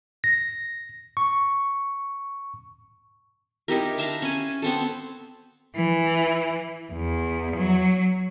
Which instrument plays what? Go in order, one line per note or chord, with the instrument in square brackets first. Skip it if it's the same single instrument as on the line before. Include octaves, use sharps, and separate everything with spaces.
[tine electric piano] A#6
C#6
[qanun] D#4 E4 G4 A#4
D4 E5 F5 A#5
C#4 G#5
B3 C4 A4
[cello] E3
E2
F#3